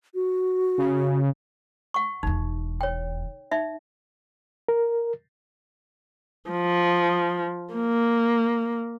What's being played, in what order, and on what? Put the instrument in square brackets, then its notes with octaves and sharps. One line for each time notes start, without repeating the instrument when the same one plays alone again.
[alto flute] F#4
[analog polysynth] C#3
[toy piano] F#5 C#6
[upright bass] E1 E2 [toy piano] D#4
[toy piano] C#5 G5
D#4 E5
[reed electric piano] A#4
[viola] F3
A#3